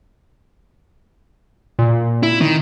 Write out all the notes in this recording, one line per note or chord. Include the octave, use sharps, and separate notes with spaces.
A#2
E4
D#3